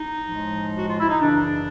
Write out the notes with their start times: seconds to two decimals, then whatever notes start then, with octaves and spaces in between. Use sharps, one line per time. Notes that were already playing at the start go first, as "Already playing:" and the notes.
Already playing: D#4
0.24 A2 F3 G#3
0.77 F#4
0.88 F4
0.99 E4
1.09 D#4
1.20 F#2 C#3 E3 D4